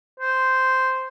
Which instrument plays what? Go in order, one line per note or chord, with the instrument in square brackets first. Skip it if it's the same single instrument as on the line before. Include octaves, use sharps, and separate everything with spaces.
[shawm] C5